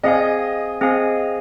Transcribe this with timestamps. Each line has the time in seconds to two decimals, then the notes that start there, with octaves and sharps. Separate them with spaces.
0.03 C4 G#4 D#5 F5 G#5
0.81 C4 G#4 F5 G#5